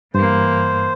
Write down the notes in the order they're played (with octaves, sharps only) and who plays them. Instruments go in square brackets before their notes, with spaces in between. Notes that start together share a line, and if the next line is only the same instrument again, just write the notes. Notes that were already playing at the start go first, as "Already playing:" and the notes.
[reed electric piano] G2 [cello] E3 A#3 [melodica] C5